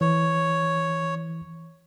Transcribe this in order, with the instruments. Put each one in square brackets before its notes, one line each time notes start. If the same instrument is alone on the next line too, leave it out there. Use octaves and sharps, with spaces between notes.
[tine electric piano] E3 [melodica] C#5